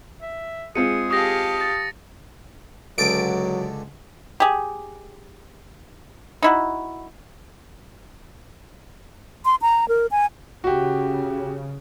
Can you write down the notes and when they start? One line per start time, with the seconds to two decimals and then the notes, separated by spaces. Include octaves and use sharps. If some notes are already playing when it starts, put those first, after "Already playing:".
0.22 E5
0.75 G#3 C4 F4 G#4 C#7 D#7
1.11 G4 F5 A5 D#6 A#6
1.60 A6 C#7
2.98 C#2 D3 F#3 A4 D7
4.40 G4 G#4
6.42 D#4 E4 F#4
9.45 C6
9.62 A#5
9.88 A#4
10.11 G#5
10.64 C#3 F#4 G4